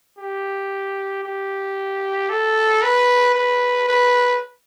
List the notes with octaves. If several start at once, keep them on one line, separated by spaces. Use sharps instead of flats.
G4
G4
A4
B4
B4
B4